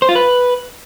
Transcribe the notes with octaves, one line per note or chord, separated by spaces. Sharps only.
C5
F4
B4